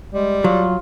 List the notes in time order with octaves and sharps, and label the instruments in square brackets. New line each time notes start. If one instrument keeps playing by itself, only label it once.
[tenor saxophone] G3 [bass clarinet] G#3
[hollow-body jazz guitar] F#3 [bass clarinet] F4